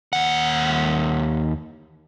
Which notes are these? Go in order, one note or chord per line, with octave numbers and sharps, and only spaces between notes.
D#2 F#5